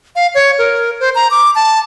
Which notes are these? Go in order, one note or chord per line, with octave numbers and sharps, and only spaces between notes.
F5
C#5
A#4
C5
A#5
D6
A5